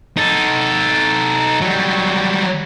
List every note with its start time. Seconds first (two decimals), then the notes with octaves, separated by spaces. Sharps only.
0.17 D#4 A4
1.61 F#3 G3